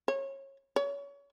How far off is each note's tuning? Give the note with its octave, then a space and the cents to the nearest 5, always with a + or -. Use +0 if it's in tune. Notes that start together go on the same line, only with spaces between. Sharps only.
C#5 -25
C#5 +30